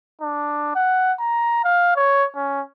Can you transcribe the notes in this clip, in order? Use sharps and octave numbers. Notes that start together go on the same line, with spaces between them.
D4
F#5
A#5
F5
C#5
C#4